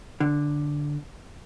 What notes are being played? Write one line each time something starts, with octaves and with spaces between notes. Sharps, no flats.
D3